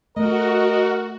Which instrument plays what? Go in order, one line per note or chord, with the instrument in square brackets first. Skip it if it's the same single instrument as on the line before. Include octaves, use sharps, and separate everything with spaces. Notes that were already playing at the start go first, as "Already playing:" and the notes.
[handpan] A3 [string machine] F#4 [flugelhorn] A#4 [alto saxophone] D#5